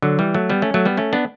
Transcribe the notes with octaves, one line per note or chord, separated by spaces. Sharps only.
D3 F#3
E3 G3
F#3 A3
G3 B3
A3 C#4
F#3 A3
G3 B3
A3 C#4
B3 D4